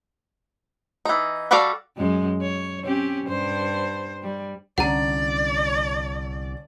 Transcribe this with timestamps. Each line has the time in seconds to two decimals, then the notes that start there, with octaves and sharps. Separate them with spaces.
1.05 E3 D#4
1.51 G3 F#4 A4 D5 F5
1.97 F#2 G#3
2.42 C#5
2.85 C4 C#4 G4
3.27 G2 C5
4.22 G3
4.78 C2 D3 C#4 D5 F#5 A#5